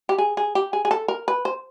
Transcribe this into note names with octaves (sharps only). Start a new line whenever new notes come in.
G4
G#4
G#4
G4
G#4
G#4
A4
A#4
B4
C5